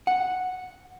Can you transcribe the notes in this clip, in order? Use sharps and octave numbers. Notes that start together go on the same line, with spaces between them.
F#5